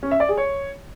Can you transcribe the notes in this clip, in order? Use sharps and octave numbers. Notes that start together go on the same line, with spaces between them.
C#4
E5
D5
G#4
C#5